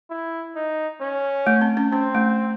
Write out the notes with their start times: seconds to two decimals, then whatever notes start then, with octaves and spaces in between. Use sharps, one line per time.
0.10 E4
0.56 D#4
1.01 C#4
1.47 A3
1.61 C4
1.77 C#4
1.92 C4 C#4
2.15 A3